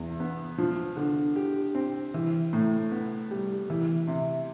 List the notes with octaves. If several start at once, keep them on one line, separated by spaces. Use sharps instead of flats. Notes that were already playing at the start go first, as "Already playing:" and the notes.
Already playing: E2
B3
F3
D3
G4
C4
E3
A2
B3
G3
E3
C3